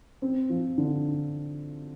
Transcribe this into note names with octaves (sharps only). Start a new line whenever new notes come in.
C4
F3
D3